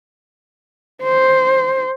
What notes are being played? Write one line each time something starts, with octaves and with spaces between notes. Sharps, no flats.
C5